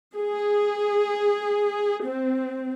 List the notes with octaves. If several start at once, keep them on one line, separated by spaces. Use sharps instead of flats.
G#4
C4